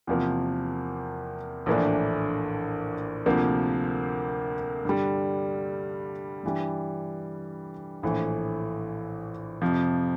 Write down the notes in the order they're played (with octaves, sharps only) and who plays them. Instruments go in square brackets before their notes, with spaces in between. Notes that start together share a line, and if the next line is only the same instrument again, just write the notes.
[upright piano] E2 C3 F3 A#3
A#1 A2 E3 A#3 D4
D2 C3 F3 A#3
G2 D3 G3
G2 E3 G3
A#1 A2 E3
F2 C3 F3